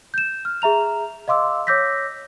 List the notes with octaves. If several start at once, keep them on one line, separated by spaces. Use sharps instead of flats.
G6 E7
F6
G#4 E5 A#5 F7
D#5 F5 C6 D6 E6
C#5 D6 E6 G6 A#6 B6